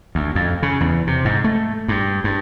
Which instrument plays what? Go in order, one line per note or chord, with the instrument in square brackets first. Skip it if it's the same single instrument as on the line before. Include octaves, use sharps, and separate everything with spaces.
[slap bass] D2
F2
C#3
E2
C3
G#2
A3
G2
G2